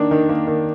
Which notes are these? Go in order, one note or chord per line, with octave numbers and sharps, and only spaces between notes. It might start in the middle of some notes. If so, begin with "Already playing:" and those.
Already playing: D#3 A#3 D4
D#3
A#3
D#3